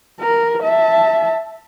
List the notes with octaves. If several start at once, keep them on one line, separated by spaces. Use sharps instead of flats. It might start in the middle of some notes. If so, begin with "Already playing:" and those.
A#4
E5 A5